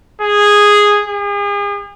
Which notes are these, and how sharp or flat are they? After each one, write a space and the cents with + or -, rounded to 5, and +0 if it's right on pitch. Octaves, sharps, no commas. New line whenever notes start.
G#4 -5
G#4 -40